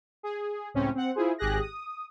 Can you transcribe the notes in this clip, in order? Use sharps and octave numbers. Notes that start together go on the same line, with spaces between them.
G#4
C#2 A2 C4 C#4
C4 F#5
E4 F4 G#4 C5
G#1 G4 G#4 F#6 A#6
D#6